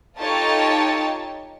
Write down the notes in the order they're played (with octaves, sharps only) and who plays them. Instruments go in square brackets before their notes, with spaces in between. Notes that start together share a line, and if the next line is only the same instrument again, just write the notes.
[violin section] D#4 F4 G4 A4 C#5 A5